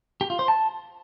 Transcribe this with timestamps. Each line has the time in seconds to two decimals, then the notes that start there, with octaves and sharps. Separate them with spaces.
0.21 G4
0.30 F4
0.39 C5
0.48 A5